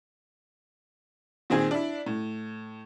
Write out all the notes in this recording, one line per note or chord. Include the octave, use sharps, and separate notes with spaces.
A#2 D#3 C4 G#4
D4 E4
A2